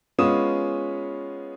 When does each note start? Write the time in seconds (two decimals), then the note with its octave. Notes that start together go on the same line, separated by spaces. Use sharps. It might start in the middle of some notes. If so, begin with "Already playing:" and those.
0.18 G#3 B3 C#4 F4 D#6 E7